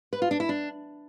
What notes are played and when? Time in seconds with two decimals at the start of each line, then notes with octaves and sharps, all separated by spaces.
0.13 B4
0.22 F4
0.31 D4
0.40 E4
0.49 D4